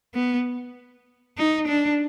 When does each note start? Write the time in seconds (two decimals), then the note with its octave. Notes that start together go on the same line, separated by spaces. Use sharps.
0.15 B3
1.37 D#4
1.68 D4